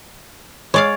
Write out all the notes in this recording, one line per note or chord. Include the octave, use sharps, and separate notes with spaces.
G#3 C#5 D5 F5